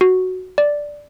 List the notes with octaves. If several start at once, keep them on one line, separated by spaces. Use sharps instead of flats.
F#4
D5